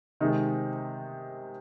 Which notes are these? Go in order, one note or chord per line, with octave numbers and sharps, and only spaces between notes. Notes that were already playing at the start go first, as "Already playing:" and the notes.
C3 D#3 G#3 D#4